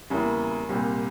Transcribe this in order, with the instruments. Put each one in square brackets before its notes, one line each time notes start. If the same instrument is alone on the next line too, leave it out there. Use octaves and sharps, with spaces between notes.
[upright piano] E2 C#3 G3 A#3 E4
C2 A#2 G3 C4